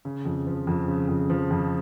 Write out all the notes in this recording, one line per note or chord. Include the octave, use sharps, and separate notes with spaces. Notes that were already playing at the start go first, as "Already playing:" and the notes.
C#3
F2
F3
F2
C#3
F2
F3
F2